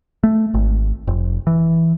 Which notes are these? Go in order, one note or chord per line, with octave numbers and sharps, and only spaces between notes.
A3
G#1
F1
E3